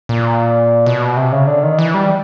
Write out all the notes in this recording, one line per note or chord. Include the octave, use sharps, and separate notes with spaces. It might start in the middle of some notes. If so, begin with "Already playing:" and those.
A#2
B2
C3
C#3
D3
D#3
E3
G3